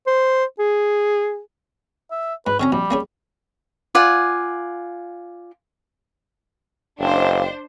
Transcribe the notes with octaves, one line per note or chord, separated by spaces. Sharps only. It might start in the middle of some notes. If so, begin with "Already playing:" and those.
C5
G#4
E5
G#2 B4
D3 C4 C#4 A#5
A#1 G3
A#3 C#4 G#4
F4 D5 F#5 G#5
F#1 D4 C5 D#5 F5 G5